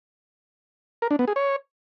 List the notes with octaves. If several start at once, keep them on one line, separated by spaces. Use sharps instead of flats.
A#4
D4
B3
G#4
C#5